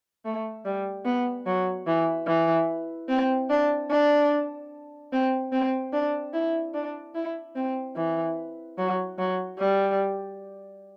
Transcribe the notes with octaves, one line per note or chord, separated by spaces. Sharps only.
A3
G3
B3
F#3
E3
E3
C4
D4
D4
C4
C4
D4
E4
D4
E4
C4
E3
F#3
F#3
G3